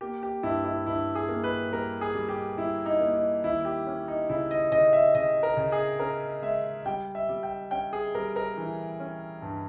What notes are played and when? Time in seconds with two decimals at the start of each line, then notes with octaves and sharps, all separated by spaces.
0.01 A#3 G4
0.23 G4
0.43 G2 E4
0.65 E4
0.87 G2 E4
1.15 G#4
1.29 A#3
1.44 B4
1.72 G3 A#4
2.01 G#4
2.15 G3
2.29 G4
2.57 G3 E4
2.86 D#4
3.00 A#3
3.15 D#4
3.44 D#2 E4
3.65 G4
3.87 C#4
4.08 D#4
4.29 C#3 E4
4.51 D#5
4.72 C#3 D#5
4.93 E5
5.15 C#3 D#5
5.43 A#4
5.57 C#3
5.72 G#4
6.00 C#4 A#4
6.42 G#3 E5
6.86 G3 G5
7.15 E5
7.29 G3
7.43 G5
7.71 C#4 G5
7.93 G#4
8.15 G3 A#4
8.36 A#4
8.57 E3
9.00 C#4
9.42 G2